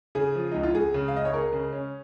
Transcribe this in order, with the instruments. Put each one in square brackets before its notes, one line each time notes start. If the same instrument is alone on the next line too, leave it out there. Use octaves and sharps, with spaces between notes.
[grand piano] C#3 [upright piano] G#4
[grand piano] F3
[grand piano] C#2 [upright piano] D#4
[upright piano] F4
[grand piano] C#2 [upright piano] G#4
[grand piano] C#3
[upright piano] F5
[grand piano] C#2 [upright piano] D#5
[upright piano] C#5
[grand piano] G#3 [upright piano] A#4
[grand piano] C#3
C#4